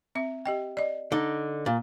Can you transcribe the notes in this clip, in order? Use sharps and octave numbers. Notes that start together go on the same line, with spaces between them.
C4 E5
G4 D#5 G5
D5 D#5
D3 D#4
A#2